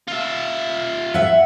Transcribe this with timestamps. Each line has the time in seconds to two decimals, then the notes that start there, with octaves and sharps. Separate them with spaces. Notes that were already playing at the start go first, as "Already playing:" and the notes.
0.08 F4 E5
1.14 E5 F#5